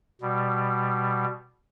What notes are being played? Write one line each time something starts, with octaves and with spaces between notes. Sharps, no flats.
B2 G3